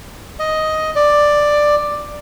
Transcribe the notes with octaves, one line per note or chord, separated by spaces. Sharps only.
D#5
D5